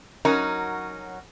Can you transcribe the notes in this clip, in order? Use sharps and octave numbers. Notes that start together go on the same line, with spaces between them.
F#3 C#4 D#4 F#4 A#4